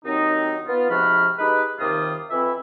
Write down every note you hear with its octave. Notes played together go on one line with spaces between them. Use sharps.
D#2 F#3 C4 D#4
B3 F4
G#2 C3 F3 F#4 B5 F6
G#3 D#4 G4 B4
D#2 C3 D#3 G3 F4 D#6
F2 E3 C4 E4 E5